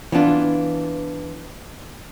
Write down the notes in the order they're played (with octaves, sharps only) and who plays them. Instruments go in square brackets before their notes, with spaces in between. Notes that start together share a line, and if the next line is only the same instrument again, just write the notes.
[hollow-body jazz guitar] E3 B3 D4 F4